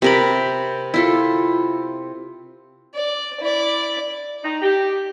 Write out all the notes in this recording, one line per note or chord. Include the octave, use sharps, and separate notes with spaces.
C3 A#4 B5
E4 F4 A4
D5
E4 D5
D#4
G4